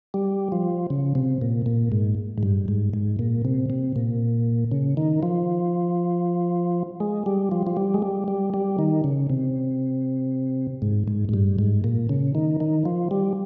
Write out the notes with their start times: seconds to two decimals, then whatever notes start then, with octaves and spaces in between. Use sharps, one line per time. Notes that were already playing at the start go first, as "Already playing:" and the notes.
0.14 G3
0.52 F3
0.90 C#3
1.15 C3
1.41 A#2
1.66 A#2
1.92 G#2
2.38 G#2
2.43 G2
2.68 G#2
2.94 G#2
3.19 A#2
3.45 C3
3.70 C3
3.96 A#2
4.71 C#3
4.97 D#3
5.23 F3
7.00 G#3
7.26 G3
7.51 F3
7.67 F3
7.77 G3
7.94 G#3
8.02 G3
8.28 G3
8.54 G3
8.79 D#3
9.04 C#3
9.30 C3
10.82 G#2
11.08 G#2
11.29 G#2
11.34 G2
11.59 G#2
11.84 A#2
12.09 C#3
12.35 D#3
12.60 D#3
12.85 F3
13.11 G3